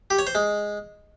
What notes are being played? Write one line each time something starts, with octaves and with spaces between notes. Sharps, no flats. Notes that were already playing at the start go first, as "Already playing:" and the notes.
G4
C#5
C5
G#3